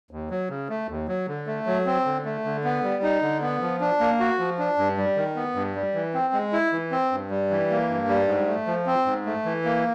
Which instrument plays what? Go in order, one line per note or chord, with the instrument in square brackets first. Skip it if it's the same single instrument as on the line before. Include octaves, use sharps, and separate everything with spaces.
[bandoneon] D#2
F#3
C#3
A3
D#2
F#3
D3
A3
F#3
C4
D3
A3
D3
B3
G3
D#4
D3
B3
F3
D4
A#3
F#4
F3
D4
G2
G3
D#3
B3
G2
G3
E3
C4
G#3
E4
E3
C4
G2
G3
E3
A#3
G2
G3
G#2
A3
F3
C4
G#2
A3
E3
A#3